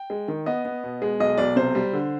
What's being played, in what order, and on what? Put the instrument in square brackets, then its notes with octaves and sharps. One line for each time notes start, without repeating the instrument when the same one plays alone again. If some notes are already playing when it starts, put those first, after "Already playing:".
Already playing: [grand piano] G5
G#3
D#3
B3 D#5
B3
B2
G#3
B1 D#5
B1 D5
C3 C5
G3
D3